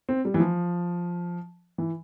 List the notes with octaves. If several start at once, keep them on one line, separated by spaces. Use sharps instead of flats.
C4
G3
E3
F3
E3